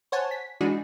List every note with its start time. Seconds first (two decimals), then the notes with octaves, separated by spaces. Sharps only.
0.12 C5 C#5 F#5 G#5 A5
0.31 B6
0.61 E3 G#3 D4 D#4 F#4 G#4